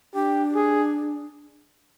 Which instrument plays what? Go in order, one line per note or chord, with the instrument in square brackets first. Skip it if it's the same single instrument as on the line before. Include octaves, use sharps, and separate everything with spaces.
[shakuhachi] D4 [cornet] G4
[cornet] G#4